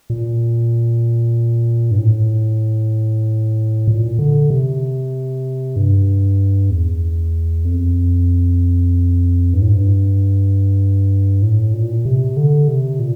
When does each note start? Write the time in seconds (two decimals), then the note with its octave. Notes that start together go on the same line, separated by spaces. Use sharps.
0.10 A#2
1.91 G2
1.98 A2
3.87 A#2
4.19 D3
4.50 C3
5.76 G2
6.71 E2
7.65 F2
9.53 G2
9.62 A2
9.70 G2
11.42 A2
11.74 A#2
12.05 C3
12.37 D3
12.68 C3
12.99 A#2